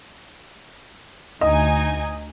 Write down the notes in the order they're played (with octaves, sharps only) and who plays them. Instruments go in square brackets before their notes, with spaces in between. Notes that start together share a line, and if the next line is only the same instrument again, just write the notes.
[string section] D2 D#4 G#5 [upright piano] D#5